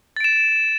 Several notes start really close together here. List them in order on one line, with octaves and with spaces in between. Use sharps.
A6 D7 E7